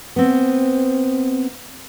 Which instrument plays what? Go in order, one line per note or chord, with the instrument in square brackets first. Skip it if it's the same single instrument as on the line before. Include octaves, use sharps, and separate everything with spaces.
[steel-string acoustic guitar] B3 C4